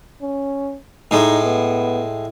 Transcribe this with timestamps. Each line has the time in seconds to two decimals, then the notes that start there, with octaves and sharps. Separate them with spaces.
0.21 C#4
1.11 A2 G#3 D#4
1.45 B3